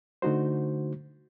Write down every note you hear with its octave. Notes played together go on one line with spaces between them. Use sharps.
D3 A3 D#4 F#4 C5